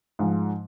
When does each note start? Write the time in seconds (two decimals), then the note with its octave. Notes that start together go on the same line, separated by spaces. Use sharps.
0.19 G#2 F3 G#3